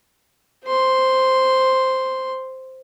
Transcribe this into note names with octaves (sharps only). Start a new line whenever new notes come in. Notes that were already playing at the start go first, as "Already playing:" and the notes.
C5 C6